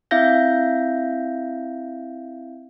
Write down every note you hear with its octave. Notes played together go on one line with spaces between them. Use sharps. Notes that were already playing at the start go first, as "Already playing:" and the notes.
C4 E4 E5 F5 G6 A#6